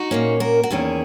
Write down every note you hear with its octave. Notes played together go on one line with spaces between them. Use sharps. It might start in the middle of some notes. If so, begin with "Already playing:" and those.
Already playing: D#4 F#4
A#2 A#3 C#4
F#4 A#4
F#4
E2 D#3 A#3 C#4 E4 G#4